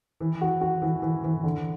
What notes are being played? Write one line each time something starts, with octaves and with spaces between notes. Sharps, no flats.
E3
F#4
F#4
E3
E3
E3
D3